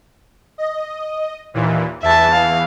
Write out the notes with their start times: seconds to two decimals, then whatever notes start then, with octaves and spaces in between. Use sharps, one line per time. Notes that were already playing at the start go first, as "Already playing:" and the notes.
0.58 D#5
1.54 D#2 A#2 E3
2.02 E2 E3 E5 A5
2.34 F5